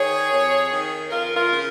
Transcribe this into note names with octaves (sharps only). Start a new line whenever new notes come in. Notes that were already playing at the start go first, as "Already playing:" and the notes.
Already playing: D#3 G#4 C#5
F2
D#3
F2 F4 A#4
F4 A#4
C#3